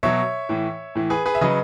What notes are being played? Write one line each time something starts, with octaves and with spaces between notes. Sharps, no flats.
B2 F#3 C#5 E5
A2 E3
A2 E3
G#4 B4
G#4 B4
E5
C#3 F#3 B4 D#5